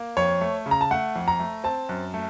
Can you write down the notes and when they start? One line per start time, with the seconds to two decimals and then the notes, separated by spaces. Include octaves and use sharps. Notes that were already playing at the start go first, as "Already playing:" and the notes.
Already playing: A#3
0.17 F2 C#5
0.41 A3
0.66 C#3
0.71 A#5
0.81 A5
0.91 A3 F#5
1.16 F2
1.28 A#5
1.40 A3
1.64 C4 A5
1.89 F#2
2.14 A3